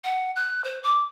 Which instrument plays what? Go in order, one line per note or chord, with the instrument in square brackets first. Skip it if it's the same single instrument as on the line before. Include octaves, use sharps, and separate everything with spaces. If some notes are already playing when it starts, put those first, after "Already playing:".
[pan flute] F#5
F#6
C5
D6